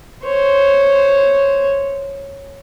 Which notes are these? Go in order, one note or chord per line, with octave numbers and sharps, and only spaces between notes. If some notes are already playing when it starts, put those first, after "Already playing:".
C5 C#5